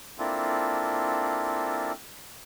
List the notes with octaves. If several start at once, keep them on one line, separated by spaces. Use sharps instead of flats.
A#3 C4 D4 E4 F4 A4